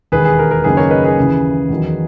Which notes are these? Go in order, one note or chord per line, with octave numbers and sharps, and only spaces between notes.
E1 D#2 D#3 G#4 B4
G#4
A#4
A#4
F#1 F#2 D#3 A#3 D#4 G#4 B4
A#4 C#5
B4 D#5
G#4 B4
D#2 C#3 E3
E2 D#3 F#3